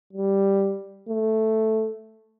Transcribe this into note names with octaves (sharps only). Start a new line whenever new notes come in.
G3
A3